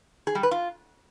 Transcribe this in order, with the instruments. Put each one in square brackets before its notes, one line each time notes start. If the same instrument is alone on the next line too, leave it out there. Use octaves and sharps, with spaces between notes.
[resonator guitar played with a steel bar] G#4
G3
B4
F4